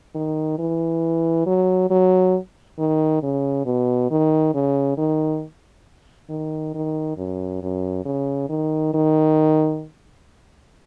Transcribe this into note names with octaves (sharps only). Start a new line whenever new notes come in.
D#3
E3
F#3
F#3
D#3
C#3
B2
D#3
C#3
D#3
D#3
D#3
F#2
F#2
C#3
D#3
D#3